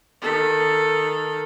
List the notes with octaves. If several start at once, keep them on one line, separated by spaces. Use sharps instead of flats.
D#3 A4